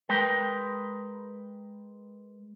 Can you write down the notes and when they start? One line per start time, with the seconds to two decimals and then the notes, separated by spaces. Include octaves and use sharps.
0.09 G#3 A#4 B4 G5